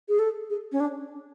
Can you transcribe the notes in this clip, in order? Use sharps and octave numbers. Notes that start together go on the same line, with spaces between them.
G#4
A4
G#4
C#4
D4